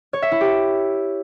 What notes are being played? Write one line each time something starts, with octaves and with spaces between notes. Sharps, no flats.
C#5
E5
E4
G4